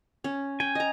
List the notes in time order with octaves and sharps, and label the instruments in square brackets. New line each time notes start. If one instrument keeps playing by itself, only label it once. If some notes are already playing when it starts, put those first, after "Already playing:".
[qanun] C#4
[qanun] G5 [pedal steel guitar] G#5
[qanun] D#5 A#5